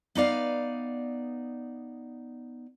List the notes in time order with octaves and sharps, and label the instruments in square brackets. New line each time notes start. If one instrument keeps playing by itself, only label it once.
[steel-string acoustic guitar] B3 D#4 D5 F5